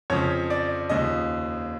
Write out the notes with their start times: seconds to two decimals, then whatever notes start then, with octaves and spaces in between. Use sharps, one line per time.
0.10 F2 C#3 F3 C#5
0.50 D5
0.89 D#2 C#3 F3 D#5